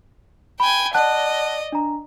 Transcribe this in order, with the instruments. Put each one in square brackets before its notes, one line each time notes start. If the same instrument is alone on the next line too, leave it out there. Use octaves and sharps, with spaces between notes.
[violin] G5 G#5 [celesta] B5
[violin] D5 D#5 [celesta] F#5 A5 F#6
[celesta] D4 A#5